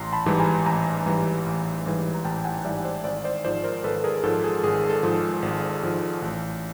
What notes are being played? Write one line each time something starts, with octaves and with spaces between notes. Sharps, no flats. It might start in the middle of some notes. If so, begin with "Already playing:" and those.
Already playing: A1 A#5 C6
A5 B5
G#2 E3 G3
G#5 A#5
A1 G#5 A#5
G#2 E3 G3
A1
G#2 E3 G3
A#5
A1 G5 A5
F#5 G#5
G#2 E3 G3 D5 E5
C5 D5
G#1 C5 D5
C5 D5
G#2 F3 C5 D5
A#4 C5
G#1 A4 B4
G#4 A#4
G#2 F3 A4
G#4
G#1 G#4
A4
G#2 F3
G#1
G#2 F3
A1